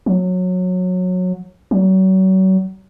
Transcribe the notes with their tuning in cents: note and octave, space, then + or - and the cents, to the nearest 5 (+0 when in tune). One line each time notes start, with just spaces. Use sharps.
F#3 -20
F#3 +35